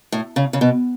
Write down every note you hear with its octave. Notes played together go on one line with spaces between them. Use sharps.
A2
C#3
C#3
B2